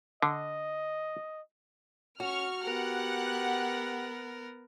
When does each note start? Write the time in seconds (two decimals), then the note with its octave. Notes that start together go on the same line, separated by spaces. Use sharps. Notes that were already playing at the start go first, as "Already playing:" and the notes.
0.22 D3 D#5
2.20 C#4 F#4 C#6 F6
2.64 B3 G4 A#4 F#5